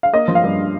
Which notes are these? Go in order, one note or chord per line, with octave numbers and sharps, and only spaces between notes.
F5
A#3 D#5
F3
F5
G2